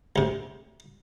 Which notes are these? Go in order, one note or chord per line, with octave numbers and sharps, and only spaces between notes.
D2 C3